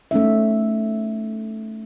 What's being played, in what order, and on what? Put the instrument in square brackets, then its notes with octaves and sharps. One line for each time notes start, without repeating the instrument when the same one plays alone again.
[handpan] A3 C#4 D#4 E5